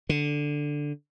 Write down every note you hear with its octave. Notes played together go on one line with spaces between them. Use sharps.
D3